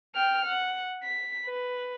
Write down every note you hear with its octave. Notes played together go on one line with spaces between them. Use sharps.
G5 F6
F#5
B6
B4